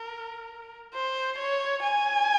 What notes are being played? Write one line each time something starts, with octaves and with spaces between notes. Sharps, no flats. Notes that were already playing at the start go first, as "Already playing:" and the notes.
Already playing: A#4
C5
C#5
G#5